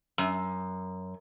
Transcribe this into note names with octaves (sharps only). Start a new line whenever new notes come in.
F#2